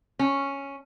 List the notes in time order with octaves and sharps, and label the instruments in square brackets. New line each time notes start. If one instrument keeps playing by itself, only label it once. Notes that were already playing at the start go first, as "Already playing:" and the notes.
[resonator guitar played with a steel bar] C#4